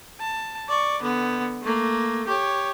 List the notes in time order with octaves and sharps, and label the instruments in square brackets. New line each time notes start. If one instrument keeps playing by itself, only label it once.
[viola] A5
D5 C#6
D3 B3
A3 A#3
G4 C#5